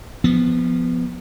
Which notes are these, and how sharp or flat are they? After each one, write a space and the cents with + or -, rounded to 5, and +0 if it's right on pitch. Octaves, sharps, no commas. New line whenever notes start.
F3 +0 B3 +0